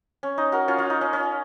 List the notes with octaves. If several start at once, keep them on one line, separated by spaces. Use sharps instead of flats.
C#4
D#4
F#4 A#4
C#4 F4
C#4 F4
D#4
C#4
C#4